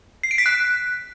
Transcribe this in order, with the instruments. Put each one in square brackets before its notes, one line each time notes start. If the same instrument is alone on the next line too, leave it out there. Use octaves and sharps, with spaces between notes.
[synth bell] C7
D7
B6
F#6